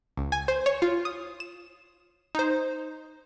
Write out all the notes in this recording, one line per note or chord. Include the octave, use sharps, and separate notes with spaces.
C#2
G#5
C5
C#5
F4
D#6
E7
D#4 C5